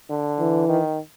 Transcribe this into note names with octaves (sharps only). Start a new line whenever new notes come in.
D3
E3
D#3